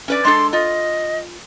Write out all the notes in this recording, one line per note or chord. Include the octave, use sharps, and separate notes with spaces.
C#4 B4 D5
G#3 D4 A4 C6
F4 D#5